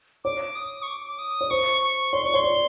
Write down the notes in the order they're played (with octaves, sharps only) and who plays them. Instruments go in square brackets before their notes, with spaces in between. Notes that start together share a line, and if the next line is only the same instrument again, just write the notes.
[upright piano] C#5 [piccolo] D6
[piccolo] D#6
C#6
D6
D6
D#6
[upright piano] C#5
[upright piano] C5 [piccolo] C#6
[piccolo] C#6
[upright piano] C#5 [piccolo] C6
[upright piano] D5 [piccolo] C#6
[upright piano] C#5 [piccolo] C6
[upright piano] D5